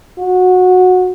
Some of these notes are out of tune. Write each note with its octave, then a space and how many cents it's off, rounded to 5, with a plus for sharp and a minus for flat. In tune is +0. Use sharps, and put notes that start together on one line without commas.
F#4 -15